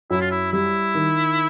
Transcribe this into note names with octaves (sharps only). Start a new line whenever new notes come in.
F#2 E4
F4
E4
G3 E4
D#3